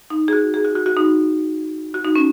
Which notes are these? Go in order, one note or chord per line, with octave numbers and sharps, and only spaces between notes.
D#4
G#4
F#4
G#4
F#4
F#4
F#4
D#4
F#4
D#4
C#4